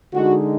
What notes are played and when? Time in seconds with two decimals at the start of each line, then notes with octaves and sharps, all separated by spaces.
0.13 D3 G#3 D#4 F#4